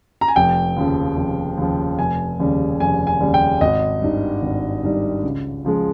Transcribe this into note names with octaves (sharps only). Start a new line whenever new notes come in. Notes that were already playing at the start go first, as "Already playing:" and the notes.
A#5
G#5
F1 G5
D#2 C#3 F3
F1
D#2 C#3 F3
F1 G#5
D#2 C#3 G3
F1 G#5
G#5
D#2 C#3 G3
G5
G#1 D#5
G2 D#3 G3
G#1
G2 D#3 G3
C#2
C#3 F3 G#3